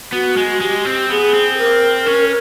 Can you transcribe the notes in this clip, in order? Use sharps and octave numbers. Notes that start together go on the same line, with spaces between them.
B3 F#4
G#3
G#3 G4
C4
B3 G#4
C4
A#4
C#4